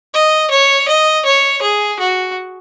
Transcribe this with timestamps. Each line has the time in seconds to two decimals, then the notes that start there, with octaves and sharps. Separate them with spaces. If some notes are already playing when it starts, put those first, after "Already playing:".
0.14 D#5
0.51 C#5
0.88 D#5
1.25 C#5
1.62 G#4
1.99 F#4